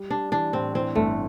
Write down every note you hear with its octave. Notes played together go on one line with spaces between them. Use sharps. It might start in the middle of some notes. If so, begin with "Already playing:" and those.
Already playing: G3
G3 D4
E3 D4
A2 C4
E3 C4
G1 A3